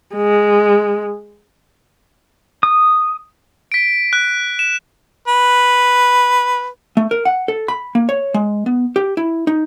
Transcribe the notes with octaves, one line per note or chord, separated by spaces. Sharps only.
G#3
D#6
B6 D7
F#6
E7
B4
A3
A#4
F#5
A4
B5
A#3
C#5
G#3
B3
G4
E4
D#4